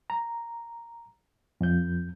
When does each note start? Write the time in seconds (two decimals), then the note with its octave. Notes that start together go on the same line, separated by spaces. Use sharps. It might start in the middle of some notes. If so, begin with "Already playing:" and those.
0.10 A#5
1.61 F2 G6